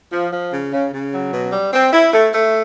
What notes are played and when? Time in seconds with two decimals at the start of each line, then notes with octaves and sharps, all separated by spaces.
0.12 F3
0.32 F3
0.52 C#3
0.73 C#3
0.92 C#3
1.13 F#3
1.33 B2
1.52 G3
1.73 C4
1.93 E4
2.13 A3
2.33 A3